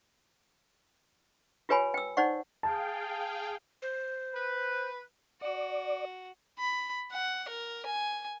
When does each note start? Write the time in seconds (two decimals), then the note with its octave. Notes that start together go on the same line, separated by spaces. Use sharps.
1.69 F4 G4 B4 C#5 G#5 B5
1.94 G5 E6
2.17 D#4 C5 D5 F#5 C#6
2.63 G#4 F5 G5 A5
3.82 C5
4.34 B4
5.41 F#4 D5
6.59 B5
7.13 F#5
7.49 A#4
7.86 G#5